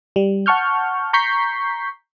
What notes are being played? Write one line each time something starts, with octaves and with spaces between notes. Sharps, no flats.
G3
F#5 A5 C#6 F6 G6
A#5 C#6 G6 B6 C7